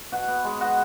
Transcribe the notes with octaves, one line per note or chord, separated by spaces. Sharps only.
B2 F#4 F#5
B3
G#3
B3 F#4 F#5